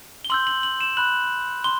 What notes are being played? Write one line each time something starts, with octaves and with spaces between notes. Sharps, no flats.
G7
C6 E6 G6 F#7
F#7
F#7
E7
B5 F#6 F#7
C6 G7